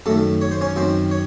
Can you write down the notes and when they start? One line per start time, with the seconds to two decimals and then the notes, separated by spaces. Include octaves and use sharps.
0.06 F#2 D#3 A3 A4
0.41 C#5
0.51 C5
0.61 C#4 C#5
0.76 F#2 D#3 C4 C5
1.11 C#5